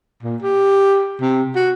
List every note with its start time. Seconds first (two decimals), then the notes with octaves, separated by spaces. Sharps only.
0.23 A#2
0.42 G4
1.21 C3
1.56 F#4